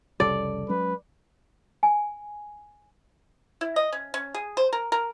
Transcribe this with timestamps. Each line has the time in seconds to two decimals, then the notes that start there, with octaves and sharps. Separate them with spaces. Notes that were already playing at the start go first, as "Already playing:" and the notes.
0.20 F1 C2 C#3 G3 A4 D5
0.69 F#3 G#3 C#4 B4
1.83 G#5
3.61 E4
3.76 D#5
3.92 C#4
4.14 C#4
4.35 G#4
4.57 C5
4.73 A#4
4.92 A#4